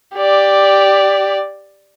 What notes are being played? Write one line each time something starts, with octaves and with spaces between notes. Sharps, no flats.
G4 D5